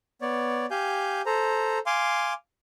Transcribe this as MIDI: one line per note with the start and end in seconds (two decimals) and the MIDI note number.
0.22 0.66 59
0.22 0.66 73
0.22 0.66 74
0.71 1.21 67
0.71 1.21 77
0.71 1.21 80
0.71 1.21 91
1.26 1.79 69
1.26 1.79 72
1.26 1.79 82
1.86 2.33 77
1.86 2.33 80
1.86 2.33 84
1.86 2.33 86